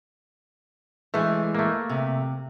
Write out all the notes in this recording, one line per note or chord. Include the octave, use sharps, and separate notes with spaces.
E3 G#3 A3
A3 A#3
C3